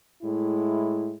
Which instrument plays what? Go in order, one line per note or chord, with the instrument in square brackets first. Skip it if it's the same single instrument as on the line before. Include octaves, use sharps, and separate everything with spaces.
[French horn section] A2 G#3 E4